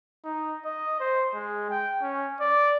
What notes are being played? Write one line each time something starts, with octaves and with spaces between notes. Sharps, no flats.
D#4
D#5
C5
G#3
G5
C#4
D5